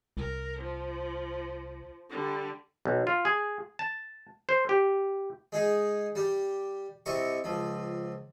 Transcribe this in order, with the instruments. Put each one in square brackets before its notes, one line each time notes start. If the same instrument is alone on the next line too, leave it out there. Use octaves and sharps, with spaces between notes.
[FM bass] C2 [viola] A#4
[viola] F3
D3 G3
[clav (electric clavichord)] B1
F4
G#4
A5
C5
G4
[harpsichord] G#3 D#4 G#4
G3 G4
C2 C3 D#5 C#6
C#2 F3